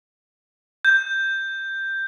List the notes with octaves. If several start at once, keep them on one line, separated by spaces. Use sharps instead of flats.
G6